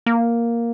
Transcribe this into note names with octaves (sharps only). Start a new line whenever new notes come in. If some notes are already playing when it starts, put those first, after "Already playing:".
A#3